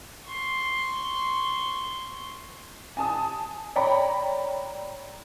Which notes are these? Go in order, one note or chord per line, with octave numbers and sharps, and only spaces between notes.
C6 C#6
G#5 A5 D#6
C#5 D5 G5 A#5 B5